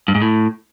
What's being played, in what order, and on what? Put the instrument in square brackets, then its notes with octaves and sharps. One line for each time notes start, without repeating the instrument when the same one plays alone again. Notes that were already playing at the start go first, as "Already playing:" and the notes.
[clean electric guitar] G2
G#2
A2